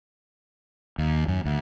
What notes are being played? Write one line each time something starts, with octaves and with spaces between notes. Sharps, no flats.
D#2
F#2
D2